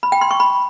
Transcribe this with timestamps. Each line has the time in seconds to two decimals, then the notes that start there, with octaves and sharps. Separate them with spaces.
0.03 B5
0.12 G5
0.21 C6
0.31 C#6
0.40 B5